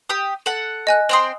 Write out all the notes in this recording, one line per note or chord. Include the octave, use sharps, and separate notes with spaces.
G4 D#6
A4 F#5 F#7
D#5 G#5 F#6
C4 G5 C6 D#6 F7 F#7